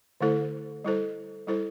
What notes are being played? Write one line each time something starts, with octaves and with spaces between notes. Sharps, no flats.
D3 A3 E4 A4 C5
G3 E4 A4 C5
G3 E4 A4 C5